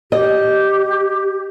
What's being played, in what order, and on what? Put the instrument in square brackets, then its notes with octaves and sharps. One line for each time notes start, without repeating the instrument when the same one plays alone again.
[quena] G4 [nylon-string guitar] D#5